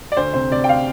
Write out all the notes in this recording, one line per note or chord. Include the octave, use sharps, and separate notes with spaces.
D5
D2 C5
C3 C5
C3 D5
G5
F5